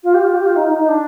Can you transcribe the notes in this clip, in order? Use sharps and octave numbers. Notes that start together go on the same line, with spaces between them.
F4
G4
F4
G4
F4
D#4
D#4
D#4
D4